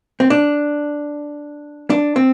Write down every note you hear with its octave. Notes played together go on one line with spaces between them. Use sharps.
C4
D4
D4
C4